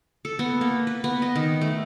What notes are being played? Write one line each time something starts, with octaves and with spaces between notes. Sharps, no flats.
A4
B3
A#3
B4
B3
D#5
D#3
A3